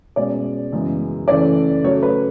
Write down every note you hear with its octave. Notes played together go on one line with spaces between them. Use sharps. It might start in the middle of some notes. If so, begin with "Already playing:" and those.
B2 G#3 C#4 D5
F#2 C#3 E3 G#3 B3
C#3 E3 A3 C#4 D5
C#3 F#3 A3 C#5
B4